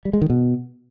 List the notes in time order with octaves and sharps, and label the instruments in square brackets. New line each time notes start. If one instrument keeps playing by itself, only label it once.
[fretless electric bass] G3
G#3
D#3
B2